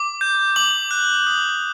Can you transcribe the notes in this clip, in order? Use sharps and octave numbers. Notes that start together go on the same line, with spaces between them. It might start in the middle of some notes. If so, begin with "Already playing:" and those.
Already playing: D6
G6
D6 F#7
F#6
D#6